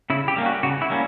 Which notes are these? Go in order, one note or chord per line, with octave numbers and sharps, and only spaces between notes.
C#3 E4
G4
G3 A#3 C#4
F#4
C#3 F#4
E4
G3 A#3 C#4